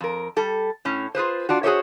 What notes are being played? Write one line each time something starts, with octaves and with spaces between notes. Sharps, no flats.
F2 A#4
G3 A4
A2 C#4
F4 G#4 B4 C5
D4 F4 F#4
F#4 G#4 A4 C5 C#5 E5